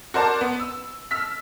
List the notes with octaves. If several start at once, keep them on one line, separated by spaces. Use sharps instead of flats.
F#4 A#4 C5 D5 A5
B3
E6
E6 F6 B6